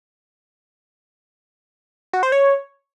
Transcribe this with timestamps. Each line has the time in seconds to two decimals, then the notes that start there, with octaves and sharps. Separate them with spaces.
2.13 F#4
2.23 C5
2.32 C#5